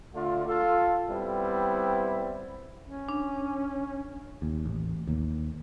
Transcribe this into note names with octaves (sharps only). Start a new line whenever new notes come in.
D3 A3 F4
F4 A4
G3 B3 C4 E4
C#4
D4
D#2
A1
D#2